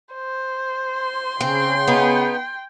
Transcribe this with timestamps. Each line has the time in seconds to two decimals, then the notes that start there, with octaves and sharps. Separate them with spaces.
0.15 C5
0.94 C6
1.41 C#3 C4 G5
1.88 B3 D#4